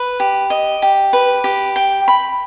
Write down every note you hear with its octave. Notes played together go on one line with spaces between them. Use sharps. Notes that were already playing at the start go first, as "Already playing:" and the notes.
Already playing: B4
G4
D#5
G4
B4
G4
G5
B5